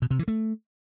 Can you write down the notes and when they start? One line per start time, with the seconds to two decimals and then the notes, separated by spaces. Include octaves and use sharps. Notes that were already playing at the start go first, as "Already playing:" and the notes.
0.02 B2
0.11 C3
0.19 E3
0.28 A3